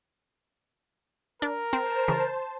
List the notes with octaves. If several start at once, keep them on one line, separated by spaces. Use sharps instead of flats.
D4 A#4
C4 C5 A5
C#3 E3